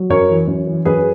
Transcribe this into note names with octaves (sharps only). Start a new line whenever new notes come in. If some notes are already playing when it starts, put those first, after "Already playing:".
Already playing: F#3
F#2 A#4 C#5
E3
F#2
E3
F#2 G#4 B4